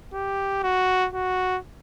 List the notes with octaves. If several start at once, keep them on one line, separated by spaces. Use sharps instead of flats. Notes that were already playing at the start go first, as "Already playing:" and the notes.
G4
F#4
F#4